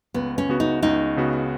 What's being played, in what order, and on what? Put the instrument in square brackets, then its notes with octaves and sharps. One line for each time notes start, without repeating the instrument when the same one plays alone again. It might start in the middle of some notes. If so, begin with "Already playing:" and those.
[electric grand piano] C#2 [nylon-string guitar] B3
[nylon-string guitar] C#4
[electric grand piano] C#3 B3 F#4
[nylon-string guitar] D#4
[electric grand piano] C#2 [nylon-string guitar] D#4
[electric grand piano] C#3 B3 F#4